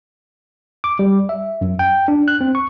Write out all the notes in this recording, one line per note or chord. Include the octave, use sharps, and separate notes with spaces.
D6
G3
E5
F#2
G5
D4
F#6
C4
C#6